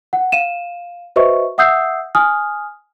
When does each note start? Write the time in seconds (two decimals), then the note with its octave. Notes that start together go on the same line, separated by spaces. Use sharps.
0.13 F#5
0.32 F5 D#7 E7
1.16 F#4 B4 C5 D#5 E5 C#6
1.58 E5 F#5 D#6 E6 G6 C7
2.15 G#5 D#6 F6